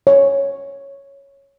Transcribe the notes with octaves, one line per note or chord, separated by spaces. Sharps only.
C#5